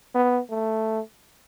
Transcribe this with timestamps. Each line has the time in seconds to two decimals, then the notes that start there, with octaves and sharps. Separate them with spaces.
0.15 B3
0.50 A3